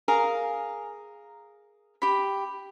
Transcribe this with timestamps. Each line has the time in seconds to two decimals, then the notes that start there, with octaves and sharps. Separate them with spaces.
0.08 G#4 A#4 F5 A#5
2.02 G4 B5